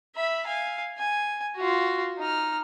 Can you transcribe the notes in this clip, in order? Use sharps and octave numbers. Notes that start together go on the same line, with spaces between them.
E5 B5
F5 G#5
G#5
F4 F#4
D#4 F6